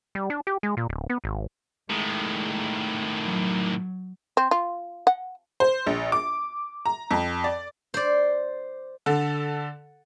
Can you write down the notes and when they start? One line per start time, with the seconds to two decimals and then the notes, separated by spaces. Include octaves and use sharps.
0.15 G3
0.30 D4
0.47 G4
0.63 G#3
0.77 A#2
0.89 D1
1.10 B3
1.24 G#1
1.90 A2 D#3 G#3
3.24 F#3
4.37 C4
4.51 F4
5.07 F#5
5.60 C5
5.87 A#1
6.12 D6
6.86 A#5
7.11 F2
7.44 D5
7.94 C5 D5
9.06 D3 A4